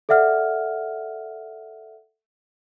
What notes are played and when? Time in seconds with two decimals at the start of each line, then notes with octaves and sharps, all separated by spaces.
0.09 A4 D5 E5 F#5 F6